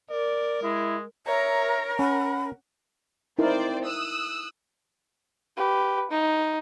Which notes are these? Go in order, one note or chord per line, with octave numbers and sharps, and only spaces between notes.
A#4 D5
G#3 E4
A#4 C#5 E5 A#5
C#4 F#5 B5
C4 D#4 E4 A#4 C5 D5
D#6 E6 F#6
G4 B4
D#4